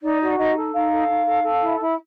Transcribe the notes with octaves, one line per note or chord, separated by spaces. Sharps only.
D#4 D5
F#4 D5
D#4 D#5
A4
D#4 F5
A4
D#4
A4
A4
E4
E4